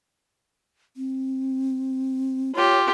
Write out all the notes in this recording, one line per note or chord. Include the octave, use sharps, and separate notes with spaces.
C4
F4 G4 C#5